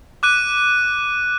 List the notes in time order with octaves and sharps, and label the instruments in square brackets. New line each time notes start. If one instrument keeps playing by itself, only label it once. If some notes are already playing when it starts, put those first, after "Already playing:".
[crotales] D6 F#6 D#7